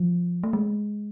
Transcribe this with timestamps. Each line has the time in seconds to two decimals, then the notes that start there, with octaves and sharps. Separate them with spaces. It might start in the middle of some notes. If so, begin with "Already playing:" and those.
Already playing: F3
0.43 A3
0.53 G#3